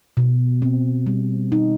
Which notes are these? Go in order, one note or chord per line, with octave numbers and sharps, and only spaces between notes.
B2
C4
G3
D#4